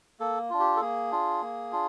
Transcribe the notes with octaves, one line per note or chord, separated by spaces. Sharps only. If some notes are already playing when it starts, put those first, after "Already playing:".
A#3 A4
D4 F4
G4
A4
A#3 G#4
D4 F4
A#3
D4 F4